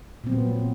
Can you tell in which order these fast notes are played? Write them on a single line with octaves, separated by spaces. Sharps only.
A#2 C4 F#3 B3